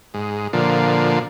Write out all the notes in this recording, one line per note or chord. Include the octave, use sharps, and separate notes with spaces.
G#2
A#2 D3 F3